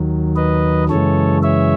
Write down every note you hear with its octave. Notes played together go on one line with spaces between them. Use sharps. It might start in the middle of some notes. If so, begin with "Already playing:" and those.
Already playing: D#2 D#3 F#3
B4 D#5
F#2 C#3 E3 G#3 A4 C#5
C#5 E5